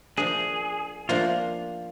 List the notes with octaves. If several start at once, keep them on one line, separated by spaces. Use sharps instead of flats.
F3 A#3 D4 G#4
F3 A#3 D4 F4